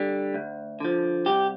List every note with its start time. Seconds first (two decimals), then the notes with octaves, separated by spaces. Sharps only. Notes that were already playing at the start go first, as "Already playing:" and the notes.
Already playing: D3 G3
0.34 D2
0.80 D3 F3
1.26 C2 G4